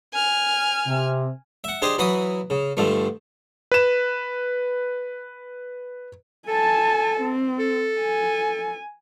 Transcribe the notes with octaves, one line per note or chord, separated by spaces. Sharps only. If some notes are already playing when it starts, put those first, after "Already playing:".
G#5 F6
C3
E5 F#5
D4 G4 G#4 C5 D#5
E3 F#3 F#4 B5 D#6
C#3
G2 D3 F3 A3
B4 E7
A4 G#5 A5
C4
A4
G#5